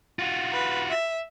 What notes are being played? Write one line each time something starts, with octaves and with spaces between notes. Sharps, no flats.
F4 F#4
B4
E5